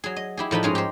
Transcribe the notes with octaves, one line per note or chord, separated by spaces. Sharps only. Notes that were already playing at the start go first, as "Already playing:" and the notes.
F#3 G#4
D#5
E4 G4 G#4
A2 F3 D#4 B5
G#2 C#4 G#4 A#4 A#5
G4 C5